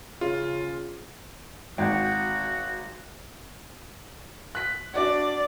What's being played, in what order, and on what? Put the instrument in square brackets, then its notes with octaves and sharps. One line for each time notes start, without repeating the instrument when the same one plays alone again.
[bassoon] C#3 [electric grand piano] F4
[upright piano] G#1 [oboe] F#4 [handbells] F#5 G5
[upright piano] F#6 B6
[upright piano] D4 F#4 [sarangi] D5